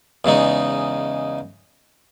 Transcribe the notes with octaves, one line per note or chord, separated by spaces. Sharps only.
E2 C#3 G#3 D#4